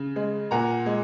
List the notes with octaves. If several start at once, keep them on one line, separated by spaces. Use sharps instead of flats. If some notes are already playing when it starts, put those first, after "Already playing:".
Already playing: C#3
G#3
A#2 F#5 A#5
G#3